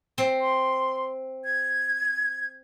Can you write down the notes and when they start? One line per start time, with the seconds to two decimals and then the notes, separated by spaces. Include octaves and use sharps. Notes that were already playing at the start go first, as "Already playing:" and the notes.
0.18 C4
0.40 C6
1.44 G#6